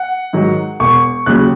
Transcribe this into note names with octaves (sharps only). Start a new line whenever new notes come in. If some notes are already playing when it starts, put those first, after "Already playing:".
Already playing: F#5
G#2 D#3 F#3
E1 C#6
D#2 C#3 F#3 F#6